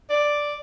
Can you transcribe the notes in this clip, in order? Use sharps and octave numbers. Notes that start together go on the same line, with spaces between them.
D5